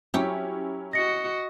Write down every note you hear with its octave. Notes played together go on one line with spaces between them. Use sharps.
F#3 C#4 E4 G4 C#5
F#4 D#5 A#6 C#7